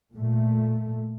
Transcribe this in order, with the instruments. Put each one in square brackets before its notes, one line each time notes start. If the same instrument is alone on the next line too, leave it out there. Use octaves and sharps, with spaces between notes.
[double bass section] A#2 A3